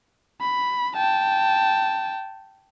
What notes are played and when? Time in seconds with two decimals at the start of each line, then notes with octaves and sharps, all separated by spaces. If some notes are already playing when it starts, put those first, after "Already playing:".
0.41 B5
0.96 G5 A5